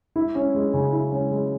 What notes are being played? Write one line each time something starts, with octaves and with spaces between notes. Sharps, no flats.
E4
C#4
G#3
C#3
E4
C#4
G#3